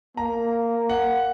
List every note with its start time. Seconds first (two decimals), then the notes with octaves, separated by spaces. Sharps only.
0.17 A#3 A#5
0.90 F#5